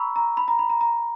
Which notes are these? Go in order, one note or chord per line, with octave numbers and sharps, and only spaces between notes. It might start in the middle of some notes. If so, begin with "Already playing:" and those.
Already playing: A#5 B5 C#6 E6
A#5
B5
A#5
B5
A#5
A#5